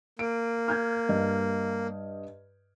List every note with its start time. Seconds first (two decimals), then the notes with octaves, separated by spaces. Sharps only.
0.19 A#3 D7
0.68 F6 G6 G#6
1.09 G2 D#5